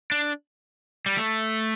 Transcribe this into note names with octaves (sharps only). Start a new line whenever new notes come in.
D4
G3
A3